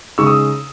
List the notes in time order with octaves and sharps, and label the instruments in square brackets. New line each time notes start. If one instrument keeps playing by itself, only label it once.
[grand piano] C#3 G#3 D#4 C#6 E6
D#6